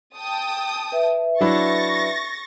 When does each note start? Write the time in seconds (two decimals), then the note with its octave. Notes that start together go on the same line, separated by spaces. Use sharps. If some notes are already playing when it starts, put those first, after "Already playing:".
0.15 G5 A5 D#6
0.92 B4 E5
1.41 F#3 D4 E4 C#6 A6 A#6